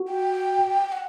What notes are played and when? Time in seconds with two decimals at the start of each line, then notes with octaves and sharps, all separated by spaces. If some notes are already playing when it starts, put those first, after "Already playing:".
Already playing: F#4
0.08 G5
0.92 F#5